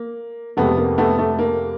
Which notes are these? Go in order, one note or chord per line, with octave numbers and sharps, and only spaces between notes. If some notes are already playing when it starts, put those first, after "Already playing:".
Already playing: A#3
F2 C3 F3 G#3 A3 B3
A#3
A3 B3
A3
A#3